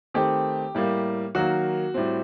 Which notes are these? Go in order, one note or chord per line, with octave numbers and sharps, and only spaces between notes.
D#3 A3 C4 G4
A2 G3 A#3
D#3 F#3 A#3 F#4
A2 G3 C4